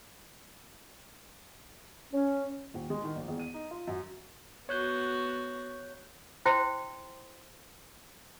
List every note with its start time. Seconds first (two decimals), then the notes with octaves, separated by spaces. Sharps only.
2.12 C#4
2.74 D#1
2.90 G#3
3.04 D#3
3.16 A#1
3.28 E1
3.39 D#7
3.54 D#4
3.71 F4
3.88 F#2
4.69 B3 F#4 C#5 F#6 G6
6.45 E4 C5 G5 C6